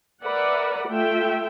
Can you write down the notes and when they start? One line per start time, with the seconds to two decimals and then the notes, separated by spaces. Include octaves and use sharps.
0.23 A#4 B4 D5 E5 F#5
0.88 A3 F4 E5 G5